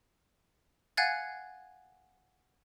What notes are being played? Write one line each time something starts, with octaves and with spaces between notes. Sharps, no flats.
F5 F#5 G#5 F#6 G#6 A6